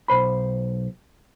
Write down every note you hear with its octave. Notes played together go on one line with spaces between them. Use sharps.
B1 C5 B5